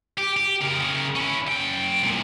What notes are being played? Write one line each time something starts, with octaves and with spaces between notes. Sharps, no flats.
G4
G4
C#3 A#4
C#4 E4
F#2 G5
C2 A#2